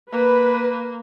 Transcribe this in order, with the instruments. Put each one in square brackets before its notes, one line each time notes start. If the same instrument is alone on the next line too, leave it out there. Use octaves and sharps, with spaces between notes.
[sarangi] A#3 [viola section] B4